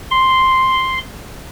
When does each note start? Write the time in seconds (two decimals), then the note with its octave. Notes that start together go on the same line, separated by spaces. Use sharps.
0.11 C6